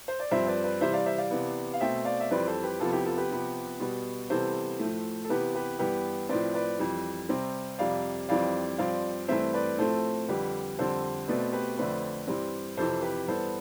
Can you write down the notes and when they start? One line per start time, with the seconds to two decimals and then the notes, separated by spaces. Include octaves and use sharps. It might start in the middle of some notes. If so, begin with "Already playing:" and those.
0.08 C5
0.20 D5
0.31 G2 F3 C4 C5 E5
0.47 B4 D5
0.64 B4 D5
0.81 C3 E3 G3 C4 C5 E5
0.93 D5 F5
1.06 C5 E5
1.18 D5 F5
1.31 C3 E3 B3
1.74 F5
1.81 B2 A3 C4 E5 G5
2.05 D5 F5
2.20 E5
2.31 F2 E3 G3 C4 B4 D5
2.47 A4 C5
2.63 G4 B4
2.80 F2 C3 F3 B3 F4 A4
2.92 E4 G4
3.06 F4 A4
3.18 G4 B4
3.31 C3 F3 B3
3.80 B2 G3 B3
4.30 C3 E3 G3 B3 A4 C5
4.79 A2 F3 A3
5.25 A4
5.29 C3 E3 B3 G4 B4
5.55 G4 B4
5.79 G2 E3 B3 G4 B4
6.29 A2 F3 C4 B4 D5
6.54 B4 D5
6.79 F2 E3 G3
7.29 C3 G3 C4
7.79 F2 C3 G3 D5 F5
8.29 F2 E3 G3 C4 D5 F5
8.78 G2 F3 C4 D5 F5
9.28 G2 E3 A3 C4 C5 E5
9.54 B4 D5
9.78 A2 F3 A3 C4 A4 C5
10.28 F2 D3 G3 G4 B4
10.78 F2 D3 G3 C4 A4 C5
11.28 B2 A3 C4 B4 D5
11.53 G4 B4
11.78 F2 D3 A3 C4 B4 D5
12.27 G2 E3 G3 C4
12.77 F2 C3 E3 A4 C5
13.03 G4 B4
13.28 G2 E3 B3 A4 C5